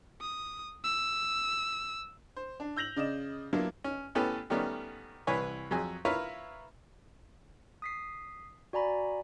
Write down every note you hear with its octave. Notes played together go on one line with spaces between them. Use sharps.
D#6
E6
C5
D4
E6 G6 A#6 F7 F#7
C#3 D5 D#5 E7
F#3 A#3 B3 D4 E4 F4
C#4
A2 B3 C#4 G4 A4 B4
D#3 G3 A3 B3 C#4
C2 E3 B4 C#5 G#5
F2 F#3 G#4
E4 F4 A#4 B4 C#5 F5
D#6 B6 C7
F#4 D5 G#5 A#5 B5